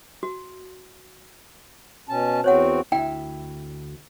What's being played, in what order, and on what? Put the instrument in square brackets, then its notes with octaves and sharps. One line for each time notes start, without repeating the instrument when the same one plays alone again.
[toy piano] F#4
[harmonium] B2 C#4 A5
[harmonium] E2 C4 F#4 [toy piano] C5 C#5 F#5
[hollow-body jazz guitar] D2 E4 [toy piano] G5